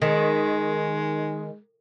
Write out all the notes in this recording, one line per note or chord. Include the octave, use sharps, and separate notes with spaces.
D#3 G#3